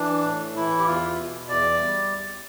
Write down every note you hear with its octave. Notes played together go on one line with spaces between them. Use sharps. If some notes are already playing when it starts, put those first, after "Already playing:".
Already playing: E3 D4
A2
E3 E4
G4
E2 F4
B2
E2 D5
G3